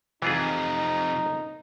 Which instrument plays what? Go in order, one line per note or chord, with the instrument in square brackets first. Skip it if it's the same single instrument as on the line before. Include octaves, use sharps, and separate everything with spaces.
[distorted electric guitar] F2 C3 [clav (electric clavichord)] E3 F4 G#4 [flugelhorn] D#4